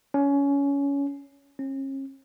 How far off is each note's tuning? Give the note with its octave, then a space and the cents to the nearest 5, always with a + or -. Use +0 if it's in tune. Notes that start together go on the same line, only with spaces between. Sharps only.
C#4 +20
C#4 -40